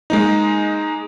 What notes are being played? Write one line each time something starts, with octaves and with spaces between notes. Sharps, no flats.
G#3 A#3 D#4